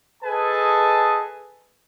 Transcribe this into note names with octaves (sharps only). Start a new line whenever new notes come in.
G#4 A4 B4 D#5 G#5 A5